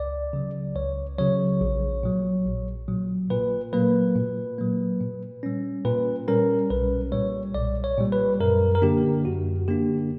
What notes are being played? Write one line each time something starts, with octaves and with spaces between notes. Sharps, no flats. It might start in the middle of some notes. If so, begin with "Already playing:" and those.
Already playing: C#2 D5
C#3 F#3
C#2 C#5
C#3 F#3 C#5
A#1
A#2 F#3
A#1
A#2 F#3
A#2 B4
F#3 A#3 B4
A#2
F#3 A#3
A#2
G3 C#4
A#2 B4
G3 C#4 A#4
B1 B4
A#2 G3 C#5
B1 D5
C#5
A#2 G3
B4
F#2 A#4
A#4
D3 A#3 D4 G4
F#2 F#4
D3 A#3 D4 G4